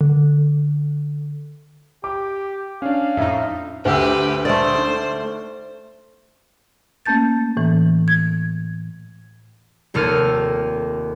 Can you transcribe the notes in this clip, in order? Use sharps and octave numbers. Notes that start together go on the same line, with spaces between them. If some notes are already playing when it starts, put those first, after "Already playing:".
D3
G4 D6
C#4 D4 F5
F2 A2 D#4 E5
D2 G4 B4 C5 F#5 E6
A3 A4 C5 D5
D#4
A3 A#3 C#4 A5 G6 A6
A2 E3
G#6
F1 D#2 A4 F6 D#7